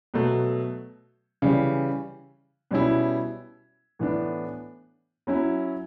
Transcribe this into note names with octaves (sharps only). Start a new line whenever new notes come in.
B2 F#3 A3
C#3 E3 G3
B2 G3 C#4 E4
A2 E3 B3 D4
F#3 C#4 E4